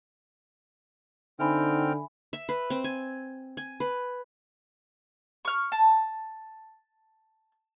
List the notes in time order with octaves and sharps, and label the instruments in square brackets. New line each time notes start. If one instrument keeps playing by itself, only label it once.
[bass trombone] D3 [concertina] C4 G5 F6 [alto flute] D#4 [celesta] E5 G#5 B5
[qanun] E5
B4
C4
G#5
G#5
B4
[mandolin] C#6 F6
A5